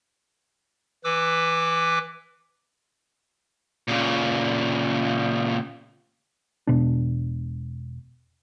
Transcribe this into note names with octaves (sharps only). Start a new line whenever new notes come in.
E3 B4 D6 E6
A#2 C#3
E1 B2 D4